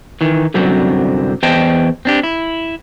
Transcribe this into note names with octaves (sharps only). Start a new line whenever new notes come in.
D#3 E3
C2 F#2 D3 F#3 C4
E2 C5 D#5 G5 A5
C4 D4 G4
E4